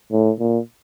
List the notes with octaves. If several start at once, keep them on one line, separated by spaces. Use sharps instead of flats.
A2
A#2